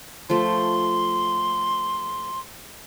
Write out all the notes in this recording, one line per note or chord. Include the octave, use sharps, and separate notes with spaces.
F3 A3 C6